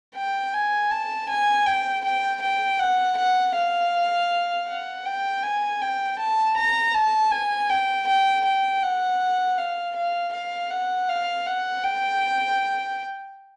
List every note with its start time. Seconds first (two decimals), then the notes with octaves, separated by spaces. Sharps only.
0.16 G5
0.53 G#5
0.91 A5
1.29 G#5
1.66 G5
2.04 G5
2.42 G5
2.79 F#5
3.17 F#5
3.55 F5
4.68 F#5
5.05 G5
5.43 G#5
5.81 G5
6.18 A5
6.56 A#5
6.94 A5
7.31 G#5
7.70 G5
8.07 G5
8.45 G5
8.82 F#5
9.58 F5
9.95 F5
10.33 F5
10.71 F#5
11.09 F5
11.46 F#5
11.84 G5